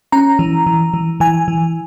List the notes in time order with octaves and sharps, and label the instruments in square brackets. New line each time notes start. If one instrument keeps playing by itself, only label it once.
[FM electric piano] C#4 A#5
E3
E3
E3
E3 G#5
E3